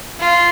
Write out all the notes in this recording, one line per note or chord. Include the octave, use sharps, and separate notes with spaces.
F4